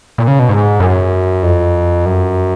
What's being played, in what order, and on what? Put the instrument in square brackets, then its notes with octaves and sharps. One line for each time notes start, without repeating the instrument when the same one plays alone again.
[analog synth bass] A#2
C#3
B2
G#2
F#2
F2
F#2